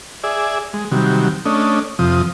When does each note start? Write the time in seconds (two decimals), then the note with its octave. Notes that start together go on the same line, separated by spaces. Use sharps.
0.24 G#4 D5 E5
0.73 G#3
0.91 C3 D#3 F#3 G3
1.46 A3 C#4 D4 D#5
1.99 F2 C3 F3 D#6